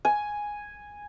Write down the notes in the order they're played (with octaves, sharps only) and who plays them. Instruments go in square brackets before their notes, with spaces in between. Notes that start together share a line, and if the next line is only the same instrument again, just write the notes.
[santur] G#5